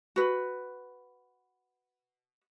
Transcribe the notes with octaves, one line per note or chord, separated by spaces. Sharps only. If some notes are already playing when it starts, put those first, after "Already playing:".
F#4 B4